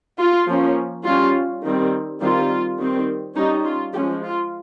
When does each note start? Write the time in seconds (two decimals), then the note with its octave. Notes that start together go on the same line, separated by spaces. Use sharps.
0.19 F4
0.48 F3 A#3 C#4
1.05 G3 C#4 F4
1.63 D#3 G3 C4
2.21 D#3 G3 C4 F4
2.79 D#3 G3 C4
3.36 G3 C#4 D#4
3.65 F4
3.94 F3 G#3 C#4 G4
4.23 F4